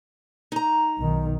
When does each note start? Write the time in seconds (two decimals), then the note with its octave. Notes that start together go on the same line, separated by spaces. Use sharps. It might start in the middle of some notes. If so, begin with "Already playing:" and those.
0.52 D#4 A#5
0.97 B1 D#3